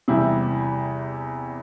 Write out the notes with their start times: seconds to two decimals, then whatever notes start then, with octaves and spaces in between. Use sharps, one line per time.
0.08 E2 C3 G3 E4 G4